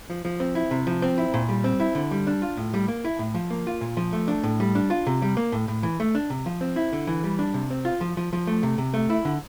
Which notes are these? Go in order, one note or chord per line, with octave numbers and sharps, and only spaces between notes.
F3
F3
C4
E4
C3
F3
C4
E4
A#2
G3
C4
E4
D3
G3
D4
F4
A2
G3
A#3
E4
A2
F3
A#3
F4
A#2
F3
A3
D4
A2
G3
D4
F4
C3
G3
A#3
A2
A2
E3
A3
D4
C3
F3
C4
E4
D3
E3
G3
D4
C3
C4
F4
F3
F3
F3
A3
C3
C3
A3
E4
D3